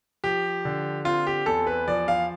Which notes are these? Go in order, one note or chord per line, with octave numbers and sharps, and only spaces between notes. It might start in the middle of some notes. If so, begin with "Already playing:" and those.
F3 G4
D3
C4 F4
G4
E2 A4
B4
F3 D5
F5